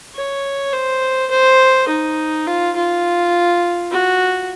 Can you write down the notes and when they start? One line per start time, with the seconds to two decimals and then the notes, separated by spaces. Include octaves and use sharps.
0.15 C#5
0.73 C5
1.31 C5
1.89 D#4
2.47 F4
2.76 F4
3.91 F#4